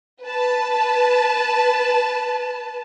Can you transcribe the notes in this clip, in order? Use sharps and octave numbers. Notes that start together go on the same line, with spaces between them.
B4 A5